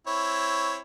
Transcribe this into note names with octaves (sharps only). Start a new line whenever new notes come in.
C4 E4 C#5